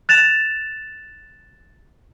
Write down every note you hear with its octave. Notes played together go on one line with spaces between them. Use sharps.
F#6 A6 E7 F7